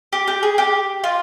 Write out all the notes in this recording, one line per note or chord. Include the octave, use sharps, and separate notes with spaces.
G4
G4
G#4
G4
F4